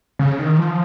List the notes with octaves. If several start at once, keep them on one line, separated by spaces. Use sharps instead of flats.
C#3
D#3
F3